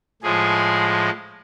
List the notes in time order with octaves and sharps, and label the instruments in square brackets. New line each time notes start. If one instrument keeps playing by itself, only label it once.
[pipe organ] A2 F3 G#3 G#4